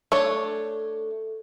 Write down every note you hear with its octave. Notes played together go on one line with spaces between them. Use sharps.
A3 D4 A4 C#5